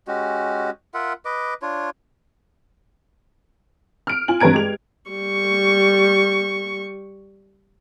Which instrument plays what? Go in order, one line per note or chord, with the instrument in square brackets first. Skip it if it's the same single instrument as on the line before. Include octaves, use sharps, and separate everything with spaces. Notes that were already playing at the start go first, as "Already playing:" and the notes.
[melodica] G#3 C#4 F#4 G4
F4 A#4 E5 F#5
B4 D#5 D6
D4 F4 C#5
[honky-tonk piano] F6 D7
F4 G#5 F#7
G2 C4 B4 A#5 G#6 D7
G#3 G4 F7
[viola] G3 C#6